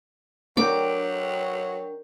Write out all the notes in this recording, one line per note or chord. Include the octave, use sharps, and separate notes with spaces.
F#3 D4 A#4 G5 D6